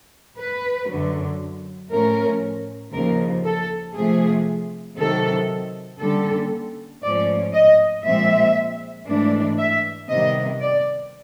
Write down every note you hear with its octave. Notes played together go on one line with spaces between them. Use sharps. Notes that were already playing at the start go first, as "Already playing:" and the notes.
B4
F#2 D3 F#3
A2 F3 A3 C#4 A#4
D#2 C#3 F3 A#4
A4
C3 F3 A3 G#4
C3 D#3 F#3 A4
D3 G3 A#3 C#4 A4
G#2 F3 A3 C#4 D5
D#5
A#2 F3 G#3 C4 E5
G#2 E3 A3 D4
E5
C3 D#3 G3 B3 D#5
D5